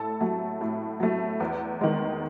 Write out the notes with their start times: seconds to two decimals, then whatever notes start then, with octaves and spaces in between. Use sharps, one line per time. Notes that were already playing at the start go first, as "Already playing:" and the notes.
Already playing: A2 A4 A5
0.20 F#3 A3
0.61 A2
1.00 F#3 A3
1.40 E2
1.81 D#3 G#3